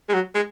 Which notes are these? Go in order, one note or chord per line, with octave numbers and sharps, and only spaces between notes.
G#3
F#3
G#3